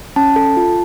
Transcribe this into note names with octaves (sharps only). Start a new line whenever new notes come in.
C#4 A5
A4
F4